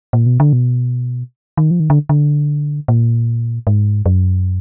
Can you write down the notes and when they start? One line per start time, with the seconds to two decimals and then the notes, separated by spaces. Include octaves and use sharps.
0.13 A#2
0.26 B2
0.40 D3
0.53 B2
1.57 D#3
1.71 F3
1.80 D#3
1.90 D3
2.09 D3
2.88 A#2
3.67 G#2
4.06 F#2